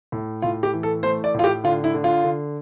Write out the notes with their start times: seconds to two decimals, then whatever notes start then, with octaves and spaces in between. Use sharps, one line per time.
0.12 A2
0.42 A2 F4
0.63 G4
0.73 E3
0.83 A4
1.03 A3 C5
1.24 D5
1.34 A2 F4
1.44 G4
1.64 D3 F4
1.84 E4
1.94 D3
2.04 F4
2.24 D3